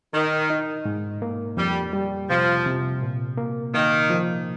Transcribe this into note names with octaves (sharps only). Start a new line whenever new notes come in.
D#3 D#4
D#4
G#2
A#3
F2 G3
G3
C3 F3
C3
A#2
A#3
D#3 A#3
F3